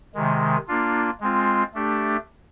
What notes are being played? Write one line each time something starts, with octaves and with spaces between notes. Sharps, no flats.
C3 D#3 G#3
A#3 D4 F4
G#3 C4 F4
A3 D4 G4